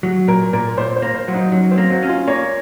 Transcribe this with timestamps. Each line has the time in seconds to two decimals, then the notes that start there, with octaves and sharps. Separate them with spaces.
0.03 F#3
0.28 A#2 A#4
0.53 A#2 A#4
0.77 A#2 C5
0.96 C5
1.02 A#3
1.15 C5
1.28 F#3
1.34 D#4
1.52 F#3 C#4
1.71 C4
1.78 A#3
1.90 F#3
2.03 C#4
2.09 F4
2.28 A#3 C#5